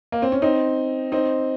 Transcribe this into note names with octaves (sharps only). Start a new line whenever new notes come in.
A#3
C4
C#4
C4 D#4
C4 D#4